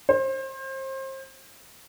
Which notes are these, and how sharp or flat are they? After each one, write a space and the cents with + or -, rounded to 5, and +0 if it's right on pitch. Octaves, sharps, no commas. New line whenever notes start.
C5 +30